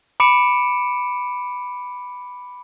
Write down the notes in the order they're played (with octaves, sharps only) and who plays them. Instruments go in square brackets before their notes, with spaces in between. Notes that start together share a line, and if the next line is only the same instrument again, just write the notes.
[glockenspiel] B5 D6 C#7 D7 E7